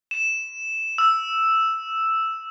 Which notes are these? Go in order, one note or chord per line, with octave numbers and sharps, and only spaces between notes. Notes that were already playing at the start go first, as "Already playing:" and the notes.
E7
E6